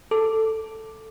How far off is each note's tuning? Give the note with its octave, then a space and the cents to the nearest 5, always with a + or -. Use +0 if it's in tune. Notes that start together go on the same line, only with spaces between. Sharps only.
A4 +5 D6 +0